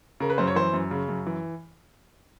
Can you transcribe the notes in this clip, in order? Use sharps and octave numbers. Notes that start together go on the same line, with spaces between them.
C#3 A#4
B4
F#2 C5
C#5
E3 C5
F#2
C#3
F#2
E3